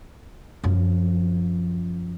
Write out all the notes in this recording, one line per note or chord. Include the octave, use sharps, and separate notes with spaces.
F#2 F3